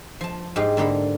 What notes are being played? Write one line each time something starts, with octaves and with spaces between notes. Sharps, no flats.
F3 A5
G#2 G#3 G4 F5
G#2 D3 A#3 A4 B5